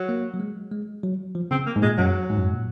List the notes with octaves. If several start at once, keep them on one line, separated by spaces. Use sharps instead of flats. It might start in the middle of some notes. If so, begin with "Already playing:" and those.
Already playing: F#3
A#3
F#3
G#3
G#3
F#3
F3
C#3 C4
A#3
G#2
A#2 G#3
F#2 F#3
G#2
F#2
G#2
A#2